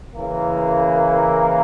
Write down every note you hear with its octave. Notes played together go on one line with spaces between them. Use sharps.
C#3 E3 A#3